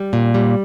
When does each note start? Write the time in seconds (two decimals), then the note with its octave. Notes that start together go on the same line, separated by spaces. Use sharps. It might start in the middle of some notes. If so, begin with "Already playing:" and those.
Already playing: G3
0.13 A#2
0.34 G3